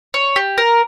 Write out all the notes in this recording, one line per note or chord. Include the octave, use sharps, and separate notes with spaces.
C#5
G4
A#4